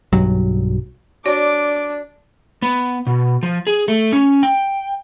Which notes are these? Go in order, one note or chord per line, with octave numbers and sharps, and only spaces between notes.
B1 G2 F#3
D4 F#4 C#5 D5 D6
B3
B2
F3
G#4
A3
C#4
G5